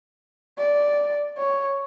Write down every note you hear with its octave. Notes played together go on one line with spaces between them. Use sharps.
D5
C#5